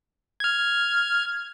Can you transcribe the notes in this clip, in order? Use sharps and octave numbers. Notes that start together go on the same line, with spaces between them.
F6 G#6